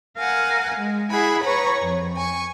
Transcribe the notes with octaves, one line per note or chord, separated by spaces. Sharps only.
A#4 F5 F#5 G#5
G#3
E4 G#4 F#5 G#5 B5
B4 C#5 A#5 B5 C#6
F2
G#5 C#6